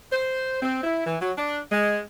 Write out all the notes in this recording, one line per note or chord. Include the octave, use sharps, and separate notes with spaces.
C5
C4
E4
E3
F#3
D4
G#3